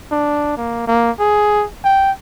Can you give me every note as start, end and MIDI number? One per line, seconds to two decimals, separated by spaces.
0.12 0.55 62
0.57 0.86 58
0.87 1.11 58
1.19 1.65 68
1.85 2.11 79